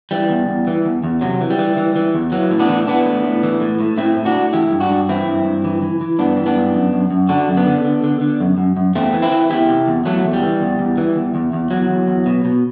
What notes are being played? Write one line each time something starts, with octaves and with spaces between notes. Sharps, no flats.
E3 G3
E2
E2
E3
E2
E2
C3 F#3
E3
G3
E3
E3
E3
E2
E3 F#3
A2
B3 D4
E3
E3 B3 D4
A2
A2
E3
A2
A2
A2 C4 E4
A2
D4 F#4
A2
E3 E4 G4
G2
D4 F#4
G2
E3 C4 E4
G2
G2
E3
E3
E3
G2 B3 D4
E3
B3 D4
G2
F#2
F#2
F#2
D3 D4 F#4
F#2
B3 D4
D3
D3
D3
D3
F#2
F#2
F#2
E2 A3 C4
E3
C4 E4
E3
E2 E4 G4
C3
E2
E2 F#3 A3
E2
G3
E3
E2
E2
E3
E2
E2
E2
E2 F#3
E2
E2
B2
B2